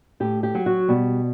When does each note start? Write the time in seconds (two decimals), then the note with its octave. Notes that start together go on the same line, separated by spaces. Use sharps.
0.20 A2 G4
0.43 G4
0.55 F#3
0.66 F#4
0.88 B2 G3